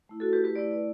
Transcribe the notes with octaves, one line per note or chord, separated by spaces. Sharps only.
A3 E4
F#4 A4
G4 B4
G4 B4
A3 E4 B4 D5
D5